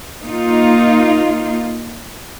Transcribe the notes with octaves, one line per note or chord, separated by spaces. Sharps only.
A#3 D#4 F4